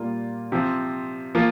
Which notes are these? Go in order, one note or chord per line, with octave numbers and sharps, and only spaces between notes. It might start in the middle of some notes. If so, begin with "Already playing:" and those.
Already playing: A#2 G3 A#3 F4
C3 F3 C4
F3 A#3 F4